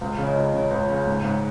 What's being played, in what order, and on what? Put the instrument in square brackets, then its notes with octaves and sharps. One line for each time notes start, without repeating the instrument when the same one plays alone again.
[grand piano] C#2 [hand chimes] F5
[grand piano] C#3 [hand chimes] C#5
[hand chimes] D#5
[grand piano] C#2
[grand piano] C#3 [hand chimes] C#5
[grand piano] C#2
C#3
G#2
G#2